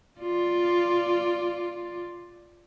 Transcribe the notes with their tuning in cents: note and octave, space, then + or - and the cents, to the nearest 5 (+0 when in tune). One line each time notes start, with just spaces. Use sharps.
F4 +0 D5 +0